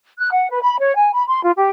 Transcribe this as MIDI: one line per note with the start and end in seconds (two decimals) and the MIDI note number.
0.19 0.29 90
0.32 0.47 78
0.49 0.60 71
0.62 0.75 83
0.78 0.94 73
0.95 1.11 80
1.13 1.23 83
1.27 1.42 84
1.43 1.51 65
1.56 1.69 67